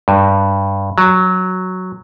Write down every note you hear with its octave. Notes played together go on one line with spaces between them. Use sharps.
G2
F#3